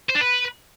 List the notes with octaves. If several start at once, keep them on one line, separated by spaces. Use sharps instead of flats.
C5
D4
B4